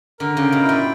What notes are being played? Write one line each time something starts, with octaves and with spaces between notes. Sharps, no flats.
D3 A#4
C#3
G5
B2
E4
A#2